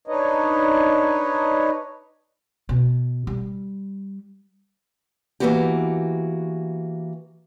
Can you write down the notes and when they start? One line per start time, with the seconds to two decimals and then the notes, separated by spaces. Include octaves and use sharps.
0.08 D4 D#4 B4 C#5 D#5
2.69 B2
3.27 G3
5.40 E3 G3 A#3 B3 F#4 G4